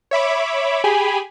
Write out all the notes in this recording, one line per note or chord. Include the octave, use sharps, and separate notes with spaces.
C#5 E5 B5 D6
G4 G#4 G#5 B5